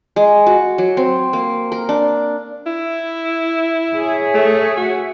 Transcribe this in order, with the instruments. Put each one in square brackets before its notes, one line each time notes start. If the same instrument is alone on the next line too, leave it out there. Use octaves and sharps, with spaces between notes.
[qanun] G#3
F#4
F#3
C4
A#3
A#4
D4
[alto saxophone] E4
[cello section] G#4 C#5 E5
[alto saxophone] A3
F#4